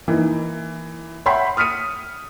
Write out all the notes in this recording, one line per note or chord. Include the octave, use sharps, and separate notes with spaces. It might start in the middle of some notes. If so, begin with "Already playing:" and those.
E3 A#3 D#4
C#5 E5 F#5 G5 B5 C6
D#6 F6 B6 C#7 D#7